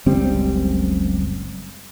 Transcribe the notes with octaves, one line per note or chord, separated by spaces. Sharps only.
F#1 C#2 G3 C4